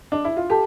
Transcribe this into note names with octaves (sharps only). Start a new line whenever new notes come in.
D4
E4
F4
G4 A4 A5